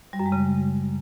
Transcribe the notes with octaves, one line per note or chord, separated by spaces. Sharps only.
G3
F#2
G#3
C#3